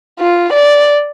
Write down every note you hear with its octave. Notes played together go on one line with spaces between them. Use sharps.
F4
D5